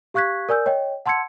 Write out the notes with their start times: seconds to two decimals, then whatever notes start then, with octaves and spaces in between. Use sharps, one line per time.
0.14 G4 F5 C#6 F#6 G#6 B6
0.49 A#4 D5 G#5 E6 G6
0.66 C#5 D#5 G5
1.06 F#5 A5 C6 E6 G#6 C#7